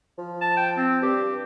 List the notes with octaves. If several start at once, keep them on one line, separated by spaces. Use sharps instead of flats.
F3
A5
G5
C4
G2 G4